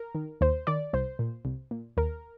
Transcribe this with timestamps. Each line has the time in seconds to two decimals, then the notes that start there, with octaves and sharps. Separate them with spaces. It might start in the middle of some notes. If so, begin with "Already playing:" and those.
Already playing: A#4
0.15 D#3
0.41 D#2 C5
0.67 D#3 D5
0.93 C2 C5
1.19 A#2
1.45 C2
1.71 A#2
1.97 D#2 A#4